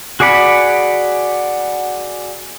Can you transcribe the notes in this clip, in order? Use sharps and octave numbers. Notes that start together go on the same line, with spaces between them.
F#4 G#4 D5 F#5 B5